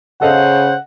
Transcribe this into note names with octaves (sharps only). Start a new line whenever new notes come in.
C#3 A4 C5 D#5 F5 F#5